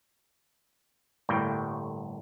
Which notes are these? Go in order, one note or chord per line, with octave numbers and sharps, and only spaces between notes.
G1 A2 G3 A#3 G5